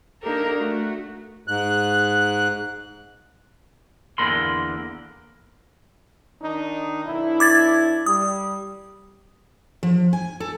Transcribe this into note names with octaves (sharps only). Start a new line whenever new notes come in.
A#3 D4 D#4 G4 A4 A#4
A3 F#4
G#2 F#6
E2 D3 A#3 A#4 B5 C6
D#3 D4 D#4
B1 D4 E4
D6 G#6 A6
G3 D#6
F3
G#5
A4